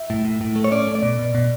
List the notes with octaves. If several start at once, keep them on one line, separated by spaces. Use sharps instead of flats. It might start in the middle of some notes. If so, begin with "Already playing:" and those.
Already playing: E5
A2
A2
A2
A3
C#5
C#4 D5
A3
D5
B2
B2
B2